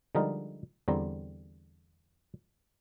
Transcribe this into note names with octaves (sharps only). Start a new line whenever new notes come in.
D3 F3 G3 G#3 D#4 A#4
E2 D3 G3 C4 A#5